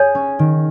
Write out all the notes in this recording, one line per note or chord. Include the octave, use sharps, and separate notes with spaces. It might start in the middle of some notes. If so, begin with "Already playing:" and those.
Already playing: G#4 C#5
C#4
D#3